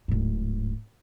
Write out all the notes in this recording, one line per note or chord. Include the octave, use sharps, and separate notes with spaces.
D1 G#2